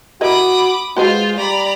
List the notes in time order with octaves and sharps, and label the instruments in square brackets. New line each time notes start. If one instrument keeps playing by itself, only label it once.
[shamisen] E4 A#4 D#5 [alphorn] F#4 [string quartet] B5 D6 D#6
[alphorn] G#3 [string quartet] F4 C5 [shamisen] F#4 B4 D#5
[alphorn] G3 [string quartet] D5 A#5 B5